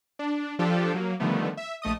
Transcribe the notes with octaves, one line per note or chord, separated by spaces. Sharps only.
D4
F3 D4 F4 G4 A4
F#3 A#3
D3 D#3 F3 G3 A3 B3
E5
A#1 A3 D#5 D#6